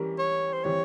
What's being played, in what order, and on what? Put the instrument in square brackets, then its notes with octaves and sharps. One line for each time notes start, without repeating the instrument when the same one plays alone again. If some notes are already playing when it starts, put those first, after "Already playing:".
Already playing: [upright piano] E3 G3 C#4 G4 A#4
[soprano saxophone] C#5
C5
[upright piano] E3 G3 C4 [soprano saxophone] C#5